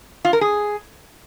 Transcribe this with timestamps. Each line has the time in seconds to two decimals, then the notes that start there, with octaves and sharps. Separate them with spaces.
0.25 F4
0.33 A#4
0.41 G#4